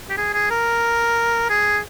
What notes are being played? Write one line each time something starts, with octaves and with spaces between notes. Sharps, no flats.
G4
G#4
G#4
A#4
G#4